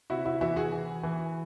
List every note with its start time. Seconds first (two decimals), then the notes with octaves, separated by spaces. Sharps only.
0.10 C3 E4 F#4
0.26 E4 F#4
0.41 E3 E4 F#4
0.56 F#4 G#4
0.72 E3
1.03 E3